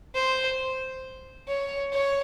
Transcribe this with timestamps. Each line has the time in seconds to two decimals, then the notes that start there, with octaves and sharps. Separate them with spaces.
0.15 C5
1.48 C#5
1.92 C#5